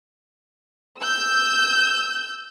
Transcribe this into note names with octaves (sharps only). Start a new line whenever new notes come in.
E6 G6